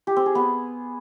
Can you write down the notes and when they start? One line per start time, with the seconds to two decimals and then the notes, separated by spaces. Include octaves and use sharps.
0.07 G4
0.16 C4
0.26 G#4
0.35 B3